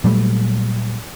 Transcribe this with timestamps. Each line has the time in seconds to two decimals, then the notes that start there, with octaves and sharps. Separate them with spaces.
0.04 A#2 F#3 G3 A3